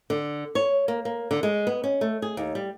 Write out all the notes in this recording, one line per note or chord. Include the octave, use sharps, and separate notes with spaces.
D3
C#5
A#3
A#3
D3
G#3
B3
C#4
A3
G#4
D#2
G3